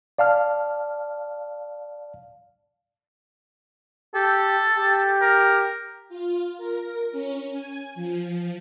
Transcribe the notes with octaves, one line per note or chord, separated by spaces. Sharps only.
D5 F5 A5 F6
G4 A4
G4
A#4
F4
A#4
C#4
G#5
F3